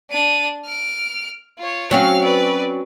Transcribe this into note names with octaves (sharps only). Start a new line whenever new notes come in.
D4 D#7
F6 D7
F4 C#5
F#3 C4 C#4 F5 F6
B4 D5